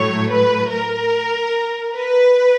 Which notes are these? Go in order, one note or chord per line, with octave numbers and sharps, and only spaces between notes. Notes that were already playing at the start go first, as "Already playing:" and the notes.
Already playing: A2 F#3 A3 C#5
B4
A#4
B4